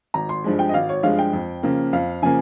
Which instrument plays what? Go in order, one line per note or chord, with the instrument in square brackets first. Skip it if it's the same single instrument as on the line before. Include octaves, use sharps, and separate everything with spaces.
[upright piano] G#1 A#5
C6
G2 F3 G#3
G5
D#5
G#1 F5
C#5
G2 F3 G#3 F5
G5
F2
C#3 F3 A#3
F2 F5
C#3 F3 A#3 G#5